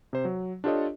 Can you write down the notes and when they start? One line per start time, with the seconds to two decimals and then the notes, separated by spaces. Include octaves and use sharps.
0.13 C3 C5
0.25 F#3
0.64 D4 F4 G4 A4 C#5 D#5